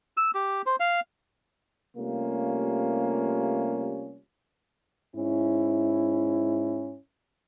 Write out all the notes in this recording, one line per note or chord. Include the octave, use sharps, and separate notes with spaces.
E6
G4
C5
F5
C3 G3 A3 A#3 C#4 F4
G#2 C#4 E4